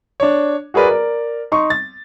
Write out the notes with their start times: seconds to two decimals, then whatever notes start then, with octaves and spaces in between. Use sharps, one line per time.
0.20 D4 C#5
0.74 F#4 G#4 A#4 B4 D5
0.88 A#4 D5
1.52 D#4 C6 C#6
1.70 A6